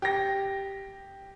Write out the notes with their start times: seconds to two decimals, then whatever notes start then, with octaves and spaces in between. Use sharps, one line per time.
0.02 G4 A#6